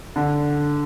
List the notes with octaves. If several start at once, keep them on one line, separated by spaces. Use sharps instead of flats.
D3